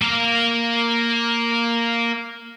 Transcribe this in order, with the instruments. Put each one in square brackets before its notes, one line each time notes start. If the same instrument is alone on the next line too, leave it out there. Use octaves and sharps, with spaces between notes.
[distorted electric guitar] A#3 F5